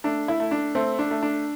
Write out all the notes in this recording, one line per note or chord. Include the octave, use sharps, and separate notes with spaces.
A3 D4
E4
A3
D4
A3 C4
D4
A3
D4